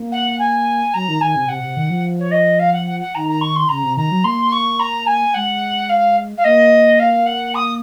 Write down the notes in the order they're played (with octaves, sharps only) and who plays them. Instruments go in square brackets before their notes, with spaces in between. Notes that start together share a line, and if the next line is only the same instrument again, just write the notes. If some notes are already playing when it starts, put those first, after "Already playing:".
Already playing: [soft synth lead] A#3
[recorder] F#5
G#5
[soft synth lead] F#3 [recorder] A#5
[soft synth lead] D#3
[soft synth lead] D#3 [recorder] G#5
[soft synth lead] C3
[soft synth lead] C3 [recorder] F#5
[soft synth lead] C3
D#3
F3
[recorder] C#5
D#5
F5
F#5
F#5
F#5
[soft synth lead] D#3 [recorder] A#5
[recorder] A#5
C#6
C6
[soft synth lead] C#3 [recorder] A#5
[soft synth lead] C3
[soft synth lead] D#3 [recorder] A#5
[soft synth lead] F#3
[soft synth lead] A#3 [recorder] C6
[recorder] C#6
A#5
G#5
[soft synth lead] G#3 [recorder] F#5
[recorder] F5
F5
[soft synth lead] A#3 [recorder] D#5
[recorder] F5
F#5
D#6